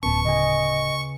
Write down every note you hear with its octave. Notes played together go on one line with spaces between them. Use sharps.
D1 B3 C#4 B4 A5 C#6
C#3 D#5 G#5